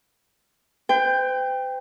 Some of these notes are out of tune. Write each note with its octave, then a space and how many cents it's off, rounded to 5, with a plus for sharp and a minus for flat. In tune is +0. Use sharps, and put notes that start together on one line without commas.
C5 -45 G5 +15